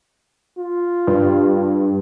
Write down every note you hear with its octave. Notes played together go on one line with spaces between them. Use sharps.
F4
G2